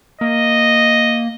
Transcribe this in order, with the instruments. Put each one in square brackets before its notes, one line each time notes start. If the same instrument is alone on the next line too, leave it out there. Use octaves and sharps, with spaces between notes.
[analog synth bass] A#3 [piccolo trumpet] D#5